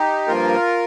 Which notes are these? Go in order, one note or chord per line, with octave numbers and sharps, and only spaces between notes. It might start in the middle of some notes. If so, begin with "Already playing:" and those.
Already playing: D#4 G4
G2 F3 A#3 F4 A#4